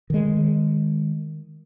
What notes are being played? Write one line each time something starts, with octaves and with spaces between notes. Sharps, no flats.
D#3 G#3